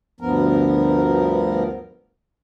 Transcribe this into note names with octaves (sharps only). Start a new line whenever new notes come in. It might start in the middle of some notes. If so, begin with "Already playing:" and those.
D2 G2 F3 B3 A#4